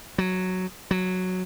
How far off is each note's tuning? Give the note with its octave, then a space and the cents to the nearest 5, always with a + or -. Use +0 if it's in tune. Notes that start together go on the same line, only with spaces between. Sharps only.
F#3 +0
F#3 -5